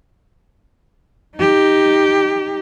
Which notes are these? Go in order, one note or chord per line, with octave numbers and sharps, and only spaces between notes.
D#4 G4